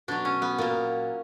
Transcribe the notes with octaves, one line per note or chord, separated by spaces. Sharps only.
B2 F#3 D4
C#4
B3
A#2 F#3 A#3